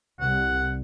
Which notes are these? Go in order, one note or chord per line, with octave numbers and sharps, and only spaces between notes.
C2 F#5